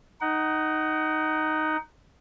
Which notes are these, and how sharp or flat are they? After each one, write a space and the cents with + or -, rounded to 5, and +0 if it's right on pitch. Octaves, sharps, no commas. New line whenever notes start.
D#4 +0 F#5 +25